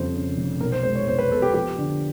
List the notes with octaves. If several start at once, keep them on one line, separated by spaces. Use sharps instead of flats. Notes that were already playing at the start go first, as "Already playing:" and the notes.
Already playing: F2 C#3 G3 C5
C#3
F1
B1 A#4
C5
G#3 C5
C#5
B1 C5
B4
B2 A4
G4
F3 G4
D3